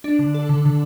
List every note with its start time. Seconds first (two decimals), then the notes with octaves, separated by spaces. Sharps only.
0.04 D4
0.19 D3
0.34 A4
0.49 D3
0.65 D3